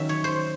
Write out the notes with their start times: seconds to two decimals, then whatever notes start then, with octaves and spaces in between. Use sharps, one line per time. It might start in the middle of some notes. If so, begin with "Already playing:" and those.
Already playing: D#3 F#3 C#4 E5
0.09 C#5
0.24 C5